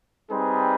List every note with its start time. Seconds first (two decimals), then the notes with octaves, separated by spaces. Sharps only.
0.29 G3 C4 D#4 G#4 B4